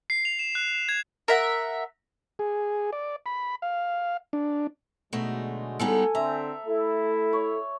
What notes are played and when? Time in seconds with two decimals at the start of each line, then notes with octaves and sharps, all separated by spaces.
0.10 C7
0.25 F7
0.39 E7
0.55 F#6
0.74 E7
0.89 G#6
1.28 A#4 E5 F#5
2.39 G#4
2.93 D5
3.26 B5
3.62 F5
4.33 D4
5.13 B2 D3 F#3 G#3 A3 D#4
5.79 G3 B3 D#4 A4 G#5
6.15 D3 C4 E5 A#5
6.67 A3 E4 A4
7.33 C#5